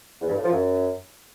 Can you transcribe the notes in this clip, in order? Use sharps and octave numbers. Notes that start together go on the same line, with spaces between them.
E2
G2
A2
F3
F#2